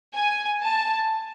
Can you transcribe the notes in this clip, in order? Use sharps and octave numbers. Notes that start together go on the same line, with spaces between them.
G#5
A5